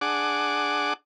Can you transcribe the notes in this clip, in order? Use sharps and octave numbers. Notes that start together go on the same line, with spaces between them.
D4 G#4 F#5 D6